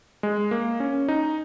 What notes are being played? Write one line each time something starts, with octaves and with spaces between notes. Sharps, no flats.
G#3
A#3
C#4
D#4